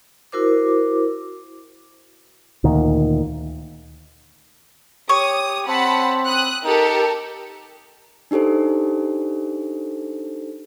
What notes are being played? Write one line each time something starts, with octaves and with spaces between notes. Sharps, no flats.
E4 F#4 A#4 C5 D6
D2 A#2 D#3
G4 C#5 D#6
C4 F#5 A5 B5
D#6 F#6
D#4 G4 A4 A#4
D4 D#4 G4 A4 C5